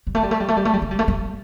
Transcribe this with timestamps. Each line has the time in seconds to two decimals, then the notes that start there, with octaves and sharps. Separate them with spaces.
0.07 G3
0.15 A3
0.23 G3
0.31 A3
0.40 G3
0.48 A3
0.57 G3
0.65 A3
0.73 G3
0.82 A3
0.91 G3
0.99 A3
1.08 G3